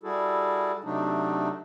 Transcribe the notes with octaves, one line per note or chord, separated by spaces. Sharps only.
G3 E4 F#4 G#4 A4
C3 F#3 A3 D4 D#4